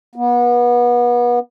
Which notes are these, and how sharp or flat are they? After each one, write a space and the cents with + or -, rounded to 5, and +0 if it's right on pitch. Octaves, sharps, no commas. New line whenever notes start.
B3 -30